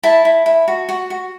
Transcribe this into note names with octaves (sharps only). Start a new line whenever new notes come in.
E4 A5
E4
E4
F#4
F#4
F#4